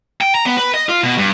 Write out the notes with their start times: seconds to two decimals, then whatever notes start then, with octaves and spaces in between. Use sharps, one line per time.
0.21 G5
0.35 A#5
0.46 B3
0.57 B4
0.74 D#5
0.89 F4
1.03 B2
1.18 G2